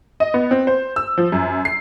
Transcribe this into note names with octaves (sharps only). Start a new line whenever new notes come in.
D#5
B3
C4
C5
E6
F3
F#2
C7